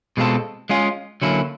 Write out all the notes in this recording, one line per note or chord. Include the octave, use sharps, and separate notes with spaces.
B2 G#3 C4 F4 A4
G#3 C#4 F4 G#4
D3 F#3 A#3 C#4 E4